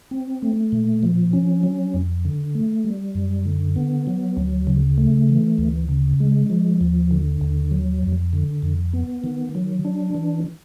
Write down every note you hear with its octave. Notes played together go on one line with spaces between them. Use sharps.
C4
A3
A#2
F3
C#4
F#3
F2
D3
A3
G3
F#2
D3
B3
F#3
D2
C#3
A3
E3
D2
C#3
G#3
F3
D#2
D3
D#2
F#3
F2
D3
F2
B3
D#3
F#3
D4
E3